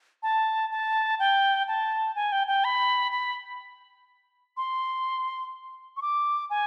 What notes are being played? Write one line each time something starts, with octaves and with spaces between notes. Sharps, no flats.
A5
A5
G5
A5
G#5
G5
G5
B5
B5
C6
C#6
D6
G#5